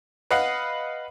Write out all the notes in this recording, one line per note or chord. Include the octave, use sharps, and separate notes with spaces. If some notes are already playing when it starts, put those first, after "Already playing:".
B4 D#5 F5 F#5